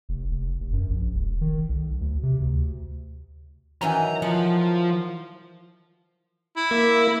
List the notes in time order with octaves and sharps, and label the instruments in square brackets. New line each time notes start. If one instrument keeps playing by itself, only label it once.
[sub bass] F1
F1
F1
F#2
A#1
E1
D#3
B1
D2
C3
D2
[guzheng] D#3 E3 F#3 [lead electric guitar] A#5
[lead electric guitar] F3 F4 [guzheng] F#5
[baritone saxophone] E4
[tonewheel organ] A#3 E5